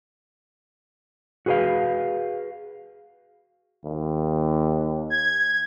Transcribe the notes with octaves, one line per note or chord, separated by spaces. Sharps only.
F#4 G#4 B4 D#5 F5
D#2
G#6